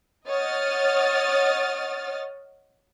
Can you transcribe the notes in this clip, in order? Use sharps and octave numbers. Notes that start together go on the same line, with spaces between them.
C#5 D#5 F#5 D#6 F6 A6